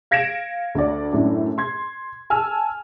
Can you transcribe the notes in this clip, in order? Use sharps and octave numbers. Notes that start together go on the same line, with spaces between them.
F5 G#6 A#6 C#7 D7 E7
D2 D5
F#2 A2 D4
C6 G#6
G#5 A5 E6 F6